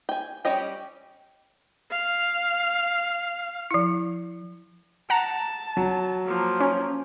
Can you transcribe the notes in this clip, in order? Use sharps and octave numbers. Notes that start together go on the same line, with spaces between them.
G5 G#5
G3 C#4 G4 D#5 G5
F5
F3 E4
F#5 A5 A#5
F#3
F3 A#3
C#4